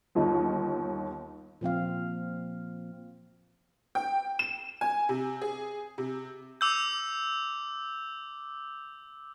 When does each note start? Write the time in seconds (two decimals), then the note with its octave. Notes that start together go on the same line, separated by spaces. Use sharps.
0.15 G1 D#2 D#4 F4
1.61 A#2 F3 C4 F5
3.95 G5
4.39 E7
4.81 G#5
5.09 C3
5.41 G#4
5.98 C3
6.61 D6 E6 G6